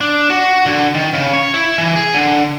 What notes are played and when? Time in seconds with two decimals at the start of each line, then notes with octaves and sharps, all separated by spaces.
0.01 D4
0.30 F#4
0.66 D3
0.95 D#3
1.13 C#3
1.34 C#5
1.54 E4
1.78 E3
1.95 G#4
2.14 D3